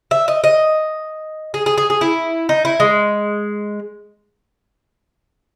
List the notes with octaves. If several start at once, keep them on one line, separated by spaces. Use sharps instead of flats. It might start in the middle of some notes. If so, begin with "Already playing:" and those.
E5
D#5
D#5
G#4
G#4
G#4
G#4
E4
D#4
E4
G#3